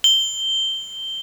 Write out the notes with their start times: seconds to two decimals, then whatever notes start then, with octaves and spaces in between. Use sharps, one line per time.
0.04 G7